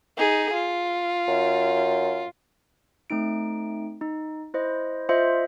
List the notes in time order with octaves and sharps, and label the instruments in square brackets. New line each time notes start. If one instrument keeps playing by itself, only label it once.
[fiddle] D#4 G#4
F4
[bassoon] F#2
[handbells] A3 C4 D#4 D7
D#4
E4 C5 D#5
F4 C5 D#5 E5 C6